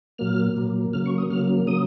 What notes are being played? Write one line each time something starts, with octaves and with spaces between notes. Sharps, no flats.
A#2 F#3 A#3 F6
A#2 F#3 A#3
C#3 F#3 A#3 F6
C#6
D#6
C#3 F#3 A#3 F6
C#3 F#3 A#3 D#6